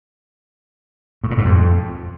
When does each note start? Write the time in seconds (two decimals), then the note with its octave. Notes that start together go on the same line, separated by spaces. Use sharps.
1.24 A2
1.31 A#2
1.38 G#2
1.45 F2